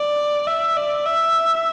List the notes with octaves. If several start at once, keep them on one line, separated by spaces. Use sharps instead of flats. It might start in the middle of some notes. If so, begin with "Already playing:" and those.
Already playing: D5
E5
D5
E5